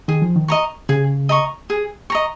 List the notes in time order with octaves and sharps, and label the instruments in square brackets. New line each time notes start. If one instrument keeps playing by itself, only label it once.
[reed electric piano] D#3 [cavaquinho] G#4
[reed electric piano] F3
D#3
[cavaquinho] D#5 A#5 C#6
[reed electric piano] C#3 [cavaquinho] G#4
[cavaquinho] D#5 A#5 C#6
G#4
D#5 A#5 C#6